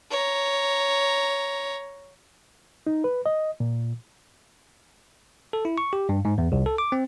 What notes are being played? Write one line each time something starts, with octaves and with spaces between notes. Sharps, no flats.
C#5 A#5
D#4
B4
D#5
A#2
A4
E4
C#6
G4
G2
G#2
E2
C2
A4
D6
C4